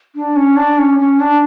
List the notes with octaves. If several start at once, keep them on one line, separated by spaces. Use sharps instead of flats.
D4
C#4
D4
C#4
C#4
D4